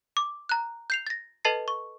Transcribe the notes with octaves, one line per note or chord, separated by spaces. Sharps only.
D6
A#5 F#6
G6 C7 F7
A6 A#6
A4 B4 D#5 A5 A6 C7
C#6